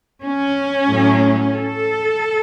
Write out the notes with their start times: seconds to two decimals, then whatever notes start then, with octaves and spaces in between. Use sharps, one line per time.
0.22 C#4
0.88 A2 F#3 A3
1.54 A4